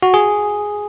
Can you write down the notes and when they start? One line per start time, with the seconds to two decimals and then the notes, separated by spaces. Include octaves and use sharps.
0.03 F#4
0.14 G#4